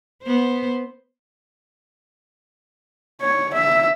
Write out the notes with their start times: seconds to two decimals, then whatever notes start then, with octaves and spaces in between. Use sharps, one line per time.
0.23 B3 C5
3.21 C#5
3.53 E5